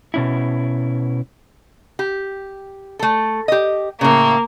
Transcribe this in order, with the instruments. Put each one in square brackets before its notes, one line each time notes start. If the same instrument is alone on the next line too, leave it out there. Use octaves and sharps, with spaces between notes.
[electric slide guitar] B2 C#4 E4
[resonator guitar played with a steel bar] G4
A3 A4
G4 D#5
[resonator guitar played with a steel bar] A2 C#3 [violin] A#3